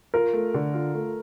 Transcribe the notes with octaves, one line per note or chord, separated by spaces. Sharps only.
F4 A#4
A3
D3
F4
A3